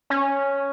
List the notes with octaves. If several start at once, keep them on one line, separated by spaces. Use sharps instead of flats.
C#4